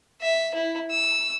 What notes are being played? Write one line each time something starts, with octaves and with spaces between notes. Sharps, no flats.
E5
E4
E6